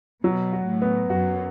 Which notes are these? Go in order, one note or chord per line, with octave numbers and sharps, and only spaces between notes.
B2 F#3
F#4
A2
B3
F#2 F#4